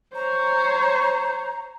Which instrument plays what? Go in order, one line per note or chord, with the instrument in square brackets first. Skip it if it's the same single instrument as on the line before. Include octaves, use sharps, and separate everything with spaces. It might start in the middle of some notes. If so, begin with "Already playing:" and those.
[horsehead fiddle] C5 C#5 [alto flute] A#5